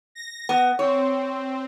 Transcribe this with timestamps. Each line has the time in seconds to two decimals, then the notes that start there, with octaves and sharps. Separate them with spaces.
0.15 A#6
0.49 B3
0.79 C4 C#5